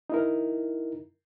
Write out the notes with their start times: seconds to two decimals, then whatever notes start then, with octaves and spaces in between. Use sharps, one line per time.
0.10 D#4 E4 A#4